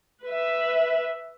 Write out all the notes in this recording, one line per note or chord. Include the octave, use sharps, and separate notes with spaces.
B4 E5